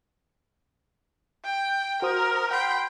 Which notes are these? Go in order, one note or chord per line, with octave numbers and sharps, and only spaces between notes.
G5
F#4 A#4 C5 D#6
F#5 G5 B5 C6